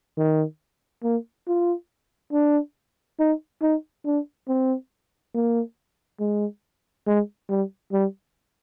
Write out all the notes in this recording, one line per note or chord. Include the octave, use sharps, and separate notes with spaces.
D#3
A#3
F4
D4
D#4
D#4
D4
C4
A#3
G#3
G#3
G3
G3